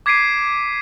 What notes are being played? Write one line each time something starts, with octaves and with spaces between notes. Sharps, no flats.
D6 G#6 B6 C7 D7 D#7